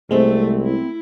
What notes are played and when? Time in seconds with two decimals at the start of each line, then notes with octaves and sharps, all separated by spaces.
0.11 C2 G#3 A3 B3 C4 E5
0.61 E4